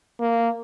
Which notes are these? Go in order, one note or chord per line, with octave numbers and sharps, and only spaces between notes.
A#3